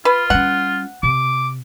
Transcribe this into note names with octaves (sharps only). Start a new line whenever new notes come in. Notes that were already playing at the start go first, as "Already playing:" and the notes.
F4 B4
G3 C#4 F#5
C3 D6